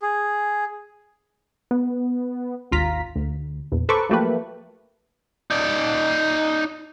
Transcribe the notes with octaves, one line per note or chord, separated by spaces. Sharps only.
G#4
B3
G#1 D#2 F4 A#5 B6
D2
A#1 E2
A4 B4 C5 A#5 C#6 D6
F3 F#3 A3 A#3 G4 B4
D#4 D5